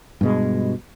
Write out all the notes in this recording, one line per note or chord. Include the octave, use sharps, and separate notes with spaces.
G2 B2 G#3